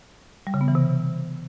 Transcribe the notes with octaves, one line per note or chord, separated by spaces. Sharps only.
G3
C#3
B3
E3
C3